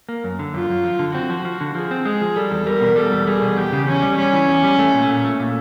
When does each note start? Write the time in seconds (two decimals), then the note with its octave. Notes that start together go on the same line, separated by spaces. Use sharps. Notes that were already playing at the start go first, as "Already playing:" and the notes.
0.09 A#3
0.24 F#2
0.39 D3
0.54 F#2 F4
0.69 F#2
0.84 F3
0.99 D3
1.14 C4 F#4
1.30 F3
1.45 F3
1.61 D3
1.75 F3 G#4
1.91 C4
2.05 G#3 G#4
2.21 F3
2.36 G3 A4
2.51 E2
2.66 G3 A#4
2.81 B2
2.96 G3 A4
3.12 E2
3.27 G3 G#4
3.42 B2
3.57 E2 G4
3.73 C#3
3.88 E2 C#4
4.02 G3
4.17 G3 C#4
4.33 E3
4.48 E2
4.63 G3
4.79 A3
4.94 A#2
5.08 A#2
5.25 A3
5.40 A#2